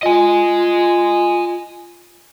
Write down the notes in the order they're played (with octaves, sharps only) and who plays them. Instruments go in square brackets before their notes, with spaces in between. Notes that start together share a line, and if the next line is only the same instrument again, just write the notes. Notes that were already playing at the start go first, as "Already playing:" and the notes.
[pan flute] F4 [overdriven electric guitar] D#5 G#5